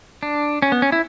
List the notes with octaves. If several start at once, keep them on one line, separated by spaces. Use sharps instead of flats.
D4
C#4
B3
C#4
E4